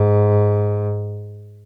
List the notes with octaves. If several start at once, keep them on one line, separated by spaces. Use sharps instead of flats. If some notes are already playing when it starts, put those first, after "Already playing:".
Already playing: G#2